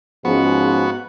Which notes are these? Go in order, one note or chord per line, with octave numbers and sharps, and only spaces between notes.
G#2 F3 B3 C#4 F#4